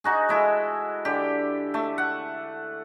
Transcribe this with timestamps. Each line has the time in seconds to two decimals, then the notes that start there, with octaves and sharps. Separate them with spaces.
0.04 D#4 F#4 G#4
0.29 G#3 E4 A4
1.05 D3 G4
1.74 A3
1.98 F#5